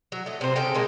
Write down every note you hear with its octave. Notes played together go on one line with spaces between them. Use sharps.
F#3
A3 D#5
C3 C5
C#3 D#4 A4 G5
A#2 G#3 A#3